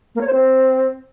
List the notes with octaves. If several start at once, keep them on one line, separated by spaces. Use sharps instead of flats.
A#3
C#5
C5
C4